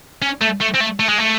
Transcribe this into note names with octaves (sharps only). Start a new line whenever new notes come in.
C#4
A3
A3
C4
A3
A3
G#3
A3